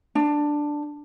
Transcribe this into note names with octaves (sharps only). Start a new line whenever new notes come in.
D4